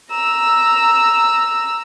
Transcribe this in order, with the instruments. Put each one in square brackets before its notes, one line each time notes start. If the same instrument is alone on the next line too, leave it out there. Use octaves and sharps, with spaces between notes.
[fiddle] A#5 E6